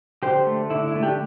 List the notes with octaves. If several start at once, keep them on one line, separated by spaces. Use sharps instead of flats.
D3 G4 C5
A3
D3 E4
E4
A3
D4 G4